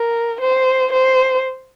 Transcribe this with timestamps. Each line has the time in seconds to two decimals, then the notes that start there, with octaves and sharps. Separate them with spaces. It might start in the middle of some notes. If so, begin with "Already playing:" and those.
Already playing: A#4
0.41 C5
0.92 C5